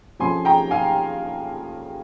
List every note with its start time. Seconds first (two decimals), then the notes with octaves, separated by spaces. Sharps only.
0.19 F2 C#3 F3 G#5 C6
0.45 G5 A#5
0.71 F5 G#5